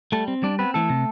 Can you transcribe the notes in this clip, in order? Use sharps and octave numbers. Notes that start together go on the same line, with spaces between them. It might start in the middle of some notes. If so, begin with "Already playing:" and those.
G3 A3 A4
C4
G3 D4 D5
B3 C4 B4
E3 A3 A4
C3